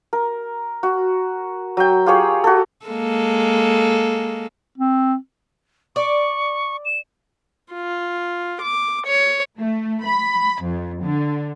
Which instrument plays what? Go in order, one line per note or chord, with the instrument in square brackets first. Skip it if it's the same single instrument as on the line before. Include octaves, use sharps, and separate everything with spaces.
[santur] A#4
F#4
F#3 G5
F4 G4 G#4 C#5
F#4 A4
[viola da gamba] G#3 A#3 A4
[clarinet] C4
[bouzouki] D5 [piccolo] C#6
[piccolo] E7
[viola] F4
D6
C#5
[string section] A3
B5
F2
D3